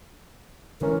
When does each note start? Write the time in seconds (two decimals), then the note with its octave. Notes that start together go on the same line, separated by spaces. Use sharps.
0.81 A2 D3 E3 G#3 C#4 D4 A#4